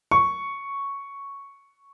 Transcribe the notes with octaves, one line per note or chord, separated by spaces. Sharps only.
C#6